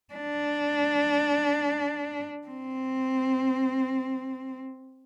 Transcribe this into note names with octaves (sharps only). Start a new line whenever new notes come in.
D4
C4